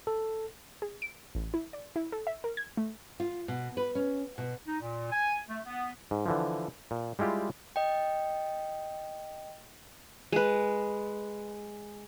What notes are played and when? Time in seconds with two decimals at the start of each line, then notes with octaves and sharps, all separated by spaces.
0.07 A4
0.82 G#4
1.02 D7
1.35 A1
1.54 E4
1.73 D5
1.96 E4
2.12 A4
2.27 E5
2.44 A#4
2.57 G#6
2.77 A3
3.20 F4
3.48 B2
3.77 B4
3.95 C#4
4.38 B2
4.68 D#4
4.81 A#2
5.12 G#5
5.49 A3
5.66 B3
6.11 G#2
6.26 D3 E3 F3
6.91 A#2
7.19 G3 G#3 E4 F4 G4
7.76 D#5 G5
10.32 G#3 B4